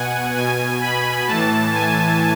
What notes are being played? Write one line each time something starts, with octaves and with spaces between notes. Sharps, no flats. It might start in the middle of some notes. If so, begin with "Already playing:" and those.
Already playing: B2 F#5 G#5
B2 G#5
B5
A2 E3 A5
G#5